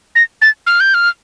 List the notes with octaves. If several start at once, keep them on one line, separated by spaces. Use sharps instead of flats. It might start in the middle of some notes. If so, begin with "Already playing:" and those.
A#6
A6
F6
G6
F6